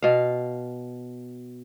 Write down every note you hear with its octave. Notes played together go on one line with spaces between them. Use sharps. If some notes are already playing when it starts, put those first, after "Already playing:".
B2 F5